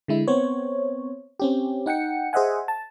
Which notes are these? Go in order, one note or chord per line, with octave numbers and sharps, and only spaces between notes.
D3 G#3 E4
B3 C4 C5 C#5
C4 C#4 G4
D#4 F#5 G5 C#7
G#4 C5 D#5 E5 F#5 G#5
A5